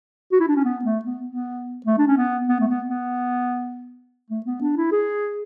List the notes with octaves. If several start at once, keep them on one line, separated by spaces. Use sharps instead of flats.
F#4
E4
D4
C#4
B3
A3
B3
B3
A3
D4
C#4
B3
B3
A3
B3
B3
A3
B3
D4
E4
G#4